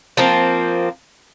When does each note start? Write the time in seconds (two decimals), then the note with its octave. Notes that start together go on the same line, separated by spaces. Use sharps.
0.17 F3 A#3 C4